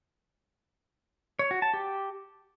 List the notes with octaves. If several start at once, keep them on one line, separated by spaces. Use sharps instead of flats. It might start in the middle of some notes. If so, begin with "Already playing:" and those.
C#5
F#4
A5
G4